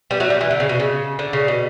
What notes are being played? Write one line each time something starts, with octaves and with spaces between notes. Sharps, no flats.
G3 B3
F#3 A3
G3
E3
D3
C#3
B2
C#3
D3
C#3
B2